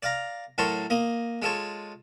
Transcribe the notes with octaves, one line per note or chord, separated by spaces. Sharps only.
D5 F5 A#5
A2 F#3 A4 A#4 C6 C#6
A#3 D#5
G#3 F4 A4 C#5